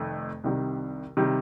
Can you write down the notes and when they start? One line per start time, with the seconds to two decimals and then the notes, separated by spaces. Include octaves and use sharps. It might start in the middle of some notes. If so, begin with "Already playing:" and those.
Already playing: F1 F2 D#3 A3
0.44 C2 C3 D#3 G3
1.17 C3 D#3 G3